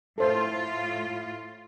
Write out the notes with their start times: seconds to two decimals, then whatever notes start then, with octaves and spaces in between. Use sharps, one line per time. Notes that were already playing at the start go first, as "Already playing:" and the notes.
0.18 A2 F4 A4 C5